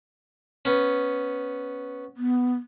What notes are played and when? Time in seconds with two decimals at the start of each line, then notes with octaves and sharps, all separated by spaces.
0.65 B3 C#4
2.17 B3